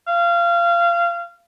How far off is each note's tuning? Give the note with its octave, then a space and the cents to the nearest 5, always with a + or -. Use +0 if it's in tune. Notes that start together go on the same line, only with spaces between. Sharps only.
F5 -25